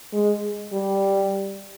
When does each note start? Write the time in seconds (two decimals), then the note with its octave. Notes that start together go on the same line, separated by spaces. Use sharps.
0.13 G#3
0.73 G3